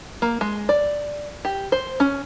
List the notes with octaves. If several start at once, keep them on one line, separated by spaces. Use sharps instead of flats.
A#3
G#3
D5
G4
C5
C#4